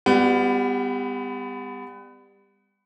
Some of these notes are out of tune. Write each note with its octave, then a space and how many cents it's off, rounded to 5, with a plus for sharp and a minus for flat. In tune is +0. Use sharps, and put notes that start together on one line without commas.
G3 +25 B3 +25 F#4 -20